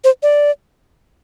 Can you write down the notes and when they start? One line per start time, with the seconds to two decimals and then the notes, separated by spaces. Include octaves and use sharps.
0.04 C5
0.23 D5